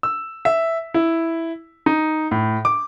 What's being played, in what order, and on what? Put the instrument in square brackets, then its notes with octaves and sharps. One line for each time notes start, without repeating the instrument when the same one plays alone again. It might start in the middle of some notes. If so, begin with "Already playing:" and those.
[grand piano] E6
E5
E4
D#4
A2
D6